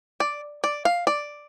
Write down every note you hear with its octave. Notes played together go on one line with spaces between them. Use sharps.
D5
D5
F5
D5